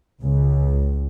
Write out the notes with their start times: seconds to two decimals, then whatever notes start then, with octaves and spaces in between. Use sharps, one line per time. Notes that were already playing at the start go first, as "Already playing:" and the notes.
0.23 C#2